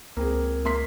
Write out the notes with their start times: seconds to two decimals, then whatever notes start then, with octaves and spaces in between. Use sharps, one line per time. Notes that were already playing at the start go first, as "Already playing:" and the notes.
0.17 C#2 A#3 C4 G#4
0.65 A#3 C6 B6